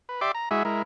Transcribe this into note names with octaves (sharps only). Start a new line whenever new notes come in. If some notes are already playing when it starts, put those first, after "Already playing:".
B4
G4 D5 E5 C6 D6
A#5
G#3 E4 F#4 G#4 E5
G#3 E4 A#4